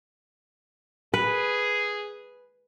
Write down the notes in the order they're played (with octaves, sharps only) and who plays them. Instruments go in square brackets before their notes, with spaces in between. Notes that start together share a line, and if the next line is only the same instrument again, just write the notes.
[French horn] G#4 [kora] B4